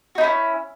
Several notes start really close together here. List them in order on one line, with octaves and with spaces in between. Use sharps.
F#4 D#4 E4 C#4